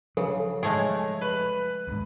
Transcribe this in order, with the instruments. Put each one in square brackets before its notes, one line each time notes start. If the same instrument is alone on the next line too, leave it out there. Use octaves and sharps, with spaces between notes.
[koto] C#3 [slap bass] F3 F#3 [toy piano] A4
[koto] G#3 A3 G#4 [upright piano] C#5
[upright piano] B4 F#7
[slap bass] D2 G#2